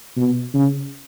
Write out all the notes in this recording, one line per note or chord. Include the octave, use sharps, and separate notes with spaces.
B2
C#3